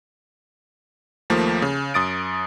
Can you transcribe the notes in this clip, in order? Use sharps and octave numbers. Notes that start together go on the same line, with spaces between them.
D#2 F3 A3 A#3
C#3
F#2 D#6 A6 D7